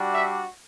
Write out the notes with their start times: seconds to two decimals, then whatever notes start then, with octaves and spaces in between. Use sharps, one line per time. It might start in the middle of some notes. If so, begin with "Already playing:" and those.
Already playing: G3 D4 F#4
0.14 E5